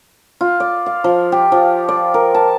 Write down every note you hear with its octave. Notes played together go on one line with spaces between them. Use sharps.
F4
D5
F5
F3
G4
F3
D5
A#4
A5